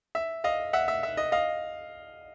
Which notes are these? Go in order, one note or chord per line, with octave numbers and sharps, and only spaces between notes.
E5
D#5 F5
E5 F#5
E5
E5
D#5
D#5 F5